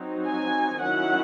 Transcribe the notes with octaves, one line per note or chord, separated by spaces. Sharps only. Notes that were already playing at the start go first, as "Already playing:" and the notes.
Already playing: F#3 C4 D#4
G#5
D#3 F#3 C#4 E4 F#5